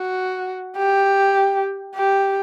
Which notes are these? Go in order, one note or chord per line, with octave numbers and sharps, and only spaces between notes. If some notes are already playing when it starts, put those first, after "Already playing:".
Already playing: F#4
G4
G4